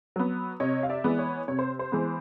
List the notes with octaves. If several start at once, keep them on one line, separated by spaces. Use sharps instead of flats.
F#3 B3
C3 C#5 D#5
F5
D5 E5
E3 G#3 B3
C#5
C3 C#5
C5
C5
E3 G#3 B3